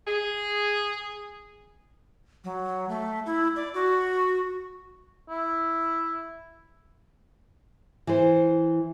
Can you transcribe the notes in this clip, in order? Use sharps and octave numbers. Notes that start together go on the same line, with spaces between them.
G#4
F#3
A3
E4
D5
F#4
E4
E3 C5